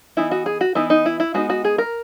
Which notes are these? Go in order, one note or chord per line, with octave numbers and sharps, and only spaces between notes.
E3 B3 D#4 E4
F#4
G#4
F#4
E3 B3 D#4 E4
D#4
E4
E4
G#3 B3 D#4 F#4
F#4
G#4
A#4